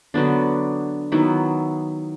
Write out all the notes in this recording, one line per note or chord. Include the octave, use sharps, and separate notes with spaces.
D3 F#3 B3 D4
D#3 F#3 B3 E4